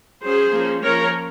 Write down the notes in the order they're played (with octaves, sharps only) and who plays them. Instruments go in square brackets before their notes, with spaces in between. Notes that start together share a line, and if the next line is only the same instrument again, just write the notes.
[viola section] F#3 C#4 G#4 C5
F3 A#3 C#4
F3 A#3 C#4 A#4 C#5